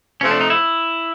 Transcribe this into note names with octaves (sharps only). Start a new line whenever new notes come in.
C3 F3 A3 C4 C#4
D4
D#4
E4